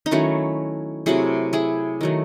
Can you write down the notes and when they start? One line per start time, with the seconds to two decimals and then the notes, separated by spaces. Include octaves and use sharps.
0.06 D#4
0.11 D#3 F#3 A3 C#4 E4
1.06 C3 F#3 A3 E4 G#4
1.53 E4 G#4
2.01 D#3 F#3 A3